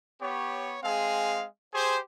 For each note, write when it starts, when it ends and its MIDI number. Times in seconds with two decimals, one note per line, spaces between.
0.20 0.77 59
0.20 0.77 67
0.20 0.77 73
0.81 1.44 56
0.81 1.44 60
0.81 1.44 68
0.81 1.44 77
1.73 1.98 67
1.73 1.98 68
1.73 1.98 72